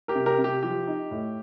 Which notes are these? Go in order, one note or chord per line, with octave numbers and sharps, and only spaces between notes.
G4 A#4
C3
G4 A#4
C3
G4
F3 G4
D#4
A2